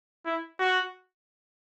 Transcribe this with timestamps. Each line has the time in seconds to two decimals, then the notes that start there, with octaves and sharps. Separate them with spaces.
0.26 E4
0.59 F#4